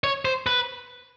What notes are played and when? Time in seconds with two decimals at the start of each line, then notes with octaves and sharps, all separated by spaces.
0.04 C#5
0.25 C5
0.47 B4